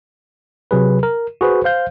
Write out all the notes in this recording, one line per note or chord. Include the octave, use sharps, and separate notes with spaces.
C3 F#3 G#4 B4
A#4
F#4 G#4 B4 C5
C5 F5 G6